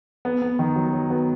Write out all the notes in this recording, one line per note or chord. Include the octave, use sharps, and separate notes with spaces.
B3
B3
D#3
F#3
F#3
B3